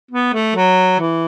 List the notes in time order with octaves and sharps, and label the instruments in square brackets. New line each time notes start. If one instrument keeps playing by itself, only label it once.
[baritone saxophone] B3
A3
F#3
E3